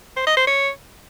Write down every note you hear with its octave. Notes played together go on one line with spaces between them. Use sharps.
C5
D#5
C5
C#5